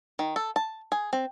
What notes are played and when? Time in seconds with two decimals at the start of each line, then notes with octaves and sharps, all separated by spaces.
0.19 D#3
0.36 A4
0.56 A5
0.92 G#4
1.13 C4